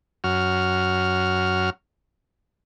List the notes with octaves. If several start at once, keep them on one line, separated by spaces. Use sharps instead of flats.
F#2 F#4 F6